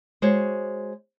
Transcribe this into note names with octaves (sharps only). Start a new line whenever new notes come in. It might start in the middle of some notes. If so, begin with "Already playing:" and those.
G#3 F#4 C5 C#5